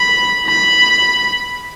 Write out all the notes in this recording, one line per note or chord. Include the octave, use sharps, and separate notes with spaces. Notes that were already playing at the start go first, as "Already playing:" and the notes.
Already playing: B5
B5